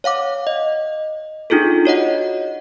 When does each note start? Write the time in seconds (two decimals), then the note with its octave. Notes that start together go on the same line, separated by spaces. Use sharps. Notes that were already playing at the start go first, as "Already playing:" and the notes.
0.04 C#5 F5 F#5 D6
0.47 D#5
1.50 D4 D#4 F4 G#4 A4
1.85 F#4 C#5 D#5 F#5